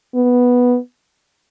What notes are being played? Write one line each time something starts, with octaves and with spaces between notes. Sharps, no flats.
B3